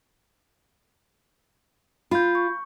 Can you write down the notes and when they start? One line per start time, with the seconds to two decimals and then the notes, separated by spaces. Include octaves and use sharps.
2.11 F4 B5 G6
2.35 C#6